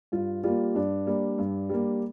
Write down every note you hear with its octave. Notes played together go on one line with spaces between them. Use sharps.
G2 F4
G3 A#3 F4
G2 D4
G3 A#3
G2
G3 A#3